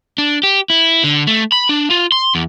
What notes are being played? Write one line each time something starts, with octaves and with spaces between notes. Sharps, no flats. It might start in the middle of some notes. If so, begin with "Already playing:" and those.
D4
G4
E4
D3
A3
B5
D4
F4
C6
E2